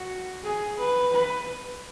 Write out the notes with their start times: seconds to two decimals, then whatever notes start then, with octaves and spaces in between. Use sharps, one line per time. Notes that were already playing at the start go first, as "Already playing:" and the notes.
Already playing: F#4
0.44 G#4
0.79 B4
1.14 B4